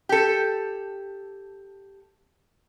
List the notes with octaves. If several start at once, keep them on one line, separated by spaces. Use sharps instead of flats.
G4 A4